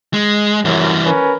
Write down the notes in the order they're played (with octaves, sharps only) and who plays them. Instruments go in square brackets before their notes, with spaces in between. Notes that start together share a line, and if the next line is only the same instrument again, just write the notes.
[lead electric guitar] G#3
[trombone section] A#1 F#2 [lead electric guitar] E3 G3
[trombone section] C#4 A#4 B4